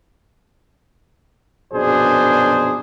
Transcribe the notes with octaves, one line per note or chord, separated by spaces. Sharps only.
A#1 F#2 B2 D4 G#4 C5